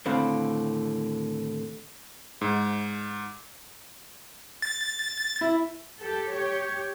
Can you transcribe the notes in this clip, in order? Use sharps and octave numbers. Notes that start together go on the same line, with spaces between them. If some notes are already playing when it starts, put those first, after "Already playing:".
D#2 A2 D3 C4 F5 B5
G#2
A6
E4
G4 A4
G4 C#5